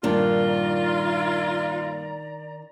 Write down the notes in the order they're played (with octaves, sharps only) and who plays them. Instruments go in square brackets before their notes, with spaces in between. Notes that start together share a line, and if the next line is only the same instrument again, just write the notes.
[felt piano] G2 A#2 [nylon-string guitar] D#3 D4 A#4 [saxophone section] F4 [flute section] D5 A#5